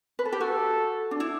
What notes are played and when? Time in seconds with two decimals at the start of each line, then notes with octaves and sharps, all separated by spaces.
0.19 B4
0.25 A4
0.32 G4
0.40 F#4 A4
1.11 D4
1.20 E4